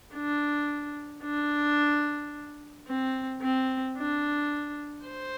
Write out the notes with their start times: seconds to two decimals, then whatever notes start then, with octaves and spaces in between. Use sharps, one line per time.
0.14 D4
1.24 D4
2.88 C4
3.42 C4
3.97 D4
5.06 C5